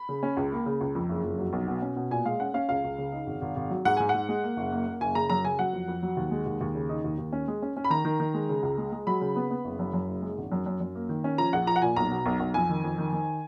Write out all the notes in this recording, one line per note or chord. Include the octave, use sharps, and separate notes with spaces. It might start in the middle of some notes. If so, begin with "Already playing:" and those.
Already playing: B5
C#3
C#4
C#2
A#3
C#3
C#2
F2
F#1
F2
F#3
B1
B2
C#4
B2
A#2 G#5
G#3 F5
C#4 F#5
C#4 F5
C#2 F5
C#2
C#3
D#4
G#1
G#1
G#1
F#3
G#2 F#5
G#2 G#5
G#2 F#5
G#3
A#3
F#1
A#3
A#3
F#1 G#5
C#3 A#5
F#2 A#5
C#3 G#5
F#3 F#5
F2
F2
F#3
D#2
G#3
D#2
D#2
C#3
D#4
D#2
D#2
C#4
G#3
C#4
C#4
B5
D#3 A#5
D#3
D#3
G#3
C#3
C#2
G#3
G#3
F#3 B5
C#3
B3
B3
F#1
F#2
F#2
F#1
G#3
G#1
F#2
F#2
F#2
A#3
D#3
C#4
F3 A#5
A#1 F#5
F3 A#5
F#5
A#2 G#5
B1 A#5
B2
B1
B1
F2 G#5
D#3
F2
D#3
D#3